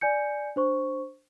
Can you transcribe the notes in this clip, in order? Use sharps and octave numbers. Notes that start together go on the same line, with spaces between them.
D5 G#5 G6 C#7
D4 C5 C#6